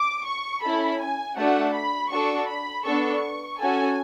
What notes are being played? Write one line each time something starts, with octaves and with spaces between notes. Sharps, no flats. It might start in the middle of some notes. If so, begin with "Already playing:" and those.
Already playing: D6
C#6
C#4 E4 A4 B5
G#5
A3 D4 F#4 A4 F#5
B5
D4 F#4 A4 C#6
B5
B3 D4 A4 C#6
C#4 F#4 A4 G#5